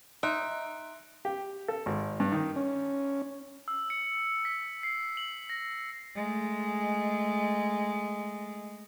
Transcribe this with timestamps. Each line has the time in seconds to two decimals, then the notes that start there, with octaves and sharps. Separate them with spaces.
0.23 D#4 E5 C6 F#6 D7
1.25 G4
1.68 A4
1.86 G#1
2.20 G2
2.32 D#3
2.56 C#4
3.68 E6
3.90 C#7
4.45 B6
4.83 C7
5.17 F#7
5.50 A#6
6.15 G#3 A3